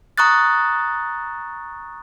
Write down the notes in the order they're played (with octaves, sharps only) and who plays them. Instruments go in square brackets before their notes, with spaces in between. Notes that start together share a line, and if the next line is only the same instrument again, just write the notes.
[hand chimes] A#5 C#6 D#6 F#6 A6